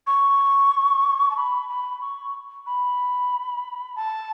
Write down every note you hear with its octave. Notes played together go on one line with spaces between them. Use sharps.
C#6
A5
B5
B5
C#6
B5
A5